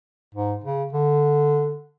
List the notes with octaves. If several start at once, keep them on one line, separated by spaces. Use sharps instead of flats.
G#2
C#3
D3